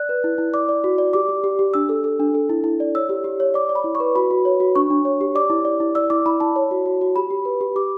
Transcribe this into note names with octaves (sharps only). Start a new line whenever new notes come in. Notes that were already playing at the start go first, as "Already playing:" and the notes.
Already playing: D5 F#6
B4
E4
E4
D5 D6
D5
F#4
D5
G4 D6
G4
G4
G4
D4 E6
A4
A4
D4
A4
E4
E4
D5
C#5 E6
G4
G4
C#5
D5 D6
D5
B5
E4
C#6
B4
F#4 B5
F#4
C#5
F#4
D4 C#6
D4
C#5
G4
D5 D6
E4
D5
E4
D5 E6
E4 D6
E4 B5
E4 A5
C#5
F#4
F#4
F#4
G4 B5
G4
B4
G4
G4 D6